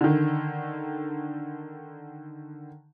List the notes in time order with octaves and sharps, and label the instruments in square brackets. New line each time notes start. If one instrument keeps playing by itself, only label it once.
[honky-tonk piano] D3 D#3